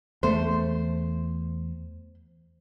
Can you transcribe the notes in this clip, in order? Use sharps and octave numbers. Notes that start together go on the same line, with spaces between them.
E2 A3 C5